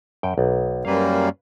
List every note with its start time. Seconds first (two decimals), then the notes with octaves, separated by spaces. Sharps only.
0.23 F#2 G5
0.38 B1
0.85 F#2 G3 A#3 B4 F5